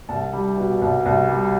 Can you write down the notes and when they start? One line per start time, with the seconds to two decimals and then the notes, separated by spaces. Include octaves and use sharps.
0.09 C2 A5
0.33 G3
0.57 B2
0.82 C2
1.06 C2
1.29 G3